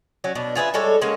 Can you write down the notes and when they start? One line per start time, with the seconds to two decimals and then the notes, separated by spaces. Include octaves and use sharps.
0.24 F#3 C#4 F#4
0.35 B2 D4
0.56 F4 G#4 B4 E5
0.74 G3 G#3 A4 C#5
1.02 G#3 A#3 C#4 F#4